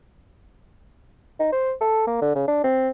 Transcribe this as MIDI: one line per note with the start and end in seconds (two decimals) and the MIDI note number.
1.40 1.52 63
1.52 1.73 72
1.81 2.07 69
2.07 2.19 58
2.21 2.33 50
2.35 2.43 49
2.48 2.60 62
2.64 2.89 60